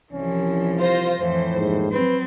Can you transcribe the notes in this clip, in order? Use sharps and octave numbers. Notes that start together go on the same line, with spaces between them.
C2 E3 F3 C#4
F4 C5 A#6
F2 A2 E3 C5
A#1 D#2 G#2
F#3 C4 B4